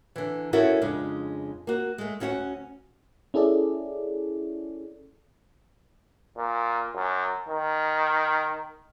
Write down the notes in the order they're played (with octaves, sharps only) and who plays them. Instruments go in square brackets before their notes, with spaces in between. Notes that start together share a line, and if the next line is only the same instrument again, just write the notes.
[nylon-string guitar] D3 E3
B3 C#4 E4 F#4 A4 A#4
F2 C#3 G#3 D4
A#3 F#4
G#3 A3
D2 C#4 F#4 F5 F#5
[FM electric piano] C#4 E4 G#4 A4 D5
[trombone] A#2
F#2
D#3